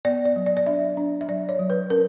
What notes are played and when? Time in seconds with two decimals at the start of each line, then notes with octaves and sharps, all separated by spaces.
0.05 B3 D5
0.25 D5
0.36 F#3
0.46 D5
0.57 D5
0.66 D4 E5
0.97 D4
1.21 E5
1.28 F#3 D5
1.49 C#5
1.59 F#3
1.70 B4
1.90 C#4 A#4